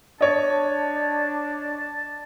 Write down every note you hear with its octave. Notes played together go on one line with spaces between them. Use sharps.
D4 C#5 D#5 A5